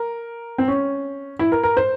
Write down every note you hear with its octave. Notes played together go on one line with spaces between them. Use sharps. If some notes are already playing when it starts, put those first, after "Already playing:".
Already playing: A#4
C4
C#4
E4
A#4
A#4
C5